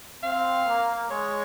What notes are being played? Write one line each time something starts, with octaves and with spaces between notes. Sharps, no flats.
C4 F5
A#3
G#3 C#5